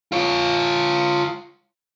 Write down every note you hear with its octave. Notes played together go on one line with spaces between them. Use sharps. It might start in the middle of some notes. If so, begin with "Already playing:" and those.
F4 C#5